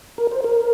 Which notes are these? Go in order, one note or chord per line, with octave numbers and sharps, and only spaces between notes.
A#4
C5
A#4